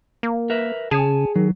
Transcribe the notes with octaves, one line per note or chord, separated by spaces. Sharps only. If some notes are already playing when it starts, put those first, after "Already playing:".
A#3
A#4 B4 E5
C#3 G#4 C#5 G#5 A5
D#3 F#3